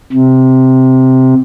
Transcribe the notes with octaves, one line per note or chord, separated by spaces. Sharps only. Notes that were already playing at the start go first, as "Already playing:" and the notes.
C3